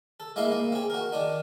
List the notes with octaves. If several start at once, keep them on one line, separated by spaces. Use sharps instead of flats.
A4
G#3 A#3 E4 D#5 F5
A#3 D#4
C4 G#4
F#4 A#4
D#3 D4 D#4